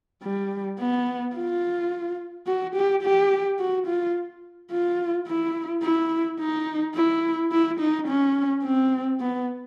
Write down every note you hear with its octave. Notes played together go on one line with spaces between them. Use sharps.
G3
B3
F4
F#4
G4
G4
F#4
F4
F4
E4
E4
D#4
E4
E4
D#4
C#4
C4
B3